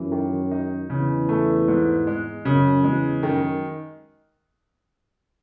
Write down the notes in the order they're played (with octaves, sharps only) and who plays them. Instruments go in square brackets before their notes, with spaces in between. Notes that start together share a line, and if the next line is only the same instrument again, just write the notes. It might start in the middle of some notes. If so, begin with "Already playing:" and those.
Already playing: [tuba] F#2 [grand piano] E3
[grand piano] D#3
D#4
[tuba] E2 [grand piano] C#3
[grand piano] A3
G#2
G#3
[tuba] F#2 [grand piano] C#3
[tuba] E2 [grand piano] G#3
[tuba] F#2 [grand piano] D#3